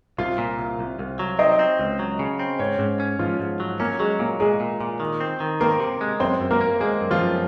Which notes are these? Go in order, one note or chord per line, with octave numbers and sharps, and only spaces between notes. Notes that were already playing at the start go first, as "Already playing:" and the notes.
C2 F4 F5
A#2
C2
C2
C2
F#3
C4 D#4 D#5
C4
C#2
F#3
C#3
C4
G#2 C#4 C#5
G#2
C#4
G#2 F3 F4
G#2
F#3
A#3 C#4
F#3 G#3
A#2 A#3
A#2 G#3 G#4
A#2
A#2
D#3
C4
D#3
A#3 C4 A#4
C3
G#3
F#2 C4 C5
F#2
A#3 A#4
A#3
G#3 A#3 G#4
F#2
F3 F4
F#2